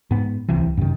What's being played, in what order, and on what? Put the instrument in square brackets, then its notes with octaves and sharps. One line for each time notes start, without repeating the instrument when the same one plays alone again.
[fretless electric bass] G#2 B3
D1 C2 C3 E3
F#2 C3 D#3